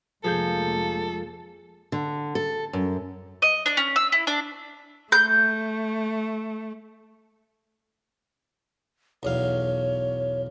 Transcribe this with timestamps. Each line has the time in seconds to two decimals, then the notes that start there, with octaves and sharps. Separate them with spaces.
0.24 F1 F3 G#3 A#3 G#4 A4 G6
1.92 D3
2.35 A4
2.73 F#2
3.42 D#5
3.66 D4
3.77 C#4
3.96 E6
4.12 E4
4.27 D4
5.12 A3 G6
9.23 B1 E2 C#5 F5